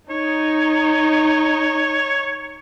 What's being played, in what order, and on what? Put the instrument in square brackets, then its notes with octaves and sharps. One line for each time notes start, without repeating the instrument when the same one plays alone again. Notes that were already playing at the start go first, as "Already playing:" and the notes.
[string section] D#4 [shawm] C#5